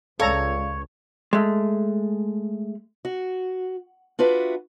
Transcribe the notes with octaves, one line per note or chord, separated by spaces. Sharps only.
C#2 A4 C#5 D5 F5 A#5
G#3 A3
F#4
D4 F4 F#4 B4 E5